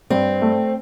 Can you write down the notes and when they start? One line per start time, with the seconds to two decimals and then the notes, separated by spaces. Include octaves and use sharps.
0.10 G2 C4
0.42 A3